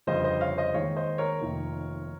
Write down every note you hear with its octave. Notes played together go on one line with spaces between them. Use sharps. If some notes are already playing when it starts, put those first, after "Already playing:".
G1 F2 C#3 G3 C5 D#5
C5 D#5
C#5 F5
C5 D#5
D#2 D#3 G#3 C#5 F5
C5 D#5
A#4 C#5
F1 F2 D#3 A#3